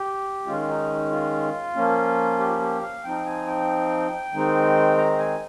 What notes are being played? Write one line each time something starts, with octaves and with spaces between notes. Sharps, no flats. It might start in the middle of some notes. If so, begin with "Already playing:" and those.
Already playing: G4
D#3 G#3 C#4 F4
D#4
F4
F3 A#3 C#4
G4
G4
F5
F3 C4 D#4 G5
G#5
G5
D#3 G#3 C4 D#4
A#5
G#5